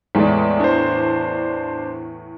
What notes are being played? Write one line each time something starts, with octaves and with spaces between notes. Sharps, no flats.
E2 A2 G#3 D5
D4 C5